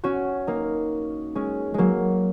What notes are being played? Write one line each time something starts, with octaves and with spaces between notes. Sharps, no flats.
C#4 F#4
A#3 D#4
G#3 C#4
F#3 G#3 A#3